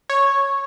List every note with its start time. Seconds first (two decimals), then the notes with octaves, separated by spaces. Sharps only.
0.10 C#5